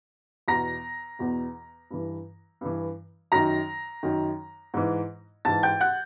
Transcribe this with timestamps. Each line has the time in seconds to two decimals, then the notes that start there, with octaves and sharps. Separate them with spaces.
0.48 E2 B2 A#5 A#6
1.19 E2 B2
1.90 G2 E3
2.61 G2 E3
3.32 F#2 D#3 A#5 A#6
4.03 F#2 D#3
4.74 G#2 E3
5.45 G#2 E3 A5 A6
5.63 G5 G6
5.80 F#5 F#6